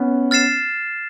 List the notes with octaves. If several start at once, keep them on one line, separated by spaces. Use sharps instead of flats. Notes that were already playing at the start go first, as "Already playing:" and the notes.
Already playing: B3 C#4
F6 A6 C7 E7